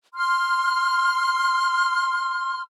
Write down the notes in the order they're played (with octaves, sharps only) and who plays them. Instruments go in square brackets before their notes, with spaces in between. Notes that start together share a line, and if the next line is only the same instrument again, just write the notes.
[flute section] C6 F6